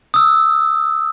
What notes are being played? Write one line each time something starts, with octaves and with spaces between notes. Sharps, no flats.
D#6 E6